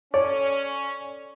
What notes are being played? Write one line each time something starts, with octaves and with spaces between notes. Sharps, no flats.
C#4 A4 C#5 D5